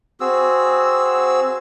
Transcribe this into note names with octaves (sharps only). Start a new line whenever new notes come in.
C4 F#4 G#4 E6